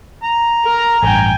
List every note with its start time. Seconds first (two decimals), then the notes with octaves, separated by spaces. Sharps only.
0.23 A#5
0.65 A#4
1.03 A1 G2 G5 G#5